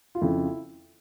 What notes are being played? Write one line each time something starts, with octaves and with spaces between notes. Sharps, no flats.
F4
F2 C#3 F3 E4